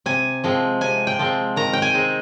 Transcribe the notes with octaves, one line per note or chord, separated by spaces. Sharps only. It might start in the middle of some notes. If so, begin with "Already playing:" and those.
C3 G#5
F3 G#3 C4
C3 G#5
G5
F3 G#3 C4
D#3 A#5
G5
G#5
G#3 C4 D#4